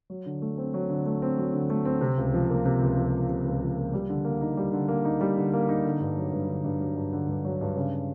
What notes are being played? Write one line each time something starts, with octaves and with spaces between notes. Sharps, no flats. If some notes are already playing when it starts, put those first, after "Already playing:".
F#3
D3
A3
C4
F#3
D3
A3
C4
F#3
D3
A3
C4
C3
C#2
F3
A#3
C3
C#2
F3
A#3
C3
C#2
F3
A#3
G3
D3
A#3
D#4
G3
D3
A#3
D#4
G3
D3
A#3
D#4
D3
G2
F#3
G2
D3
G2
F#3
G2
D3
G2
F#3
G2
C#3